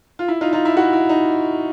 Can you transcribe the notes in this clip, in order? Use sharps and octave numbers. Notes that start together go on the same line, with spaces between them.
F4
E4
D#4 F4
D#4 F4
E4
E4 F#4
E4
D#4